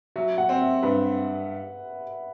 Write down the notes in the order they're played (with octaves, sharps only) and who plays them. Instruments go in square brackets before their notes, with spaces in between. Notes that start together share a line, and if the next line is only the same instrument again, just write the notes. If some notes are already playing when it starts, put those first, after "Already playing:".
[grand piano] F#3 [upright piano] E5
[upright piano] F#5
[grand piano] C4
[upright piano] E5
[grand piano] G2 [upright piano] B4